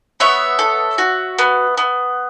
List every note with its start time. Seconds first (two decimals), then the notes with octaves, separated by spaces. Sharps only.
0.20 B3 C#5 E5
0.59 A4
0.98 F#4
1.39 B3
1.78 B3